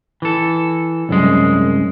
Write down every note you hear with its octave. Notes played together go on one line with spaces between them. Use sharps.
E3 A4
C2 F#2 G#3